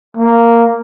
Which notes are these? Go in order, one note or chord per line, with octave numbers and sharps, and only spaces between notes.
A#3